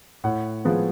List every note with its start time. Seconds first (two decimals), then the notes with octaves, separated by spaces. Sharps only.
0.24 A2 F#5
0.65 F3 G#3 B3